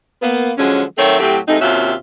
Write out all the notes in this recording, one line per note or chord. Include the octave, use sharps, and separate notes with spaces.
A#3 B3
D3 F3 F#3 G#3 C#4
D#3 F#3 A3 C4 C#5 E5
A2 F#3 A3 C4 G4
C3 G#3 A3 C4 D#4
D#2 C3 C#4 F4 F#4 E5